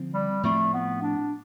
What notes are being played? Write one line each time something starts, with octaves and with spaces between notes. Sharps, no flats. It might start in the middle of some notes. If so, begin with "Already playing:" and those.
Already playing: D3 F3 C4
G3
A2 F3 A3 C4
B3
D4